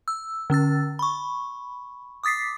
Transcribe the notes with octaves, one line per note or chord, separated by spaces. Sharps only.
E6
D3 C#4 E6 A6
B5 C#6
D6 D#6 A6 B6 C7